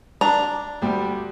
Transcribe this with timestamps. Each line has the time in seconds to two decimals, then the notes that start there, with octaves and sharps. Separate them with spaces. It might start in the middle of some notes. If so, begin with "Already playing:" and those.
0.21 D4 A#5
0.82 D2 G3